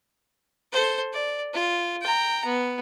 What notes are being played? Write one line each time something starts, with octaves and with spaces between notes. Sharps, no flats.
A4 C5
D5
F4
G5 A#5
B3